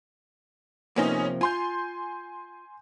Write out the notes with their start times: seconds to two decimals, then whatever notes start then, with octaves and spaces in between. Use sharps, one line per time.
0.96 C3 F3 A#3 B3 C#4 D#4
1.41 F4 G#5 C6 G6